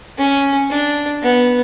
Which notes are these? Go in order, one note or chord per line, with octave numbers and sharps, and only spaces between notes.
C#4
D4
B3